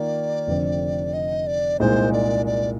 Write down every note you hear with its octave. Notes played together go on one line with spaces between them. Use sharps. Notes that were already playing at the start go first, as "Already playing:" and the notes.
Already playing: D#3 A#3 F4 D5
F1 F2 D3 F3 C4
D#5
D5
C2 A#2 G#3 D#4 A#4 C5
D5
D5